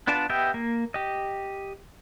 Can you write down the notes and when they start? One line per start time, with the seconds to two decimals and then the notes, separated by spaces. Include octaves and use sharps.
0.07 B3 D4 F4 D5 A5
0.30 B3 G4 D#5 E5 G5
0.54 A#3
0.94 G4 D#5